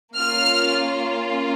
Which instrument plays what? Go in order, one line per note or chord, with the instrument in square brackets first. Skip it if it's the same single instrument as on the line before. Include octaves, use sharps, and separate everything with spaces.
[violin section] A#3 C#4 F4 F6